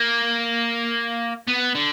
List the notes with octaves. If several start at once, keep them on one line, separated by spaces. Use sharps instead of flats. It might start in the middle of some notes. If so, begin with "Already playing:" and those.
Already playing: A#3
B3
D3